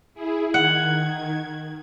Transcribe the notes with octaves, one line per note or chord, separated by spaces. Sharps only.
E4 G#4
D#3 F#5 G#6